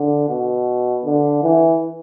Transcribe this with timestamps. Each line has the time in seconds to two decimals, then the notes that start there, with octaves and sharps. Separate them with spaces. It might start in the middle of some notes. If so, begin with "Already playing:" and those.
Already playing: D3
0.29 B2
1.05 D3
1.43 E3